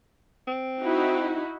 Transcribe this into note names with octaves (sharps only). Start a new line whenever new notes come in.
C4
D#4 E4 F#4